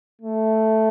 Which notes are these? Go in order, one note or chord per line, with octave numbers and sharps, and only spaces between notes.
A3